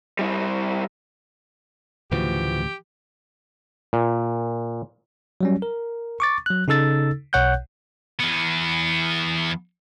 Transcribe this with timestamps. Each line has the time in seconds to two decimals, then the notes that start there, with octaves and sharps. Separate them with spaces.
0.19 G3 E4
2.11 D2 A2 C#3 E3 F3 F#4 G4
3.93 A#2
5.41 F#3 G3 C#4
5.62 A#4
6.20 C#6 D6 A6
6.46 F#3 F#6
6.68 C#3 D#4 A4 E6 A6
7.33 B1 B2 C#5 F#5 F#6 G6
8.20 E2 B3